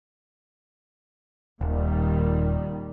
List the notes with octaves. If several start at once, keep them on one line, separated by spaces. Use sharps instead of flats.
D#1 A#2 D#3 G3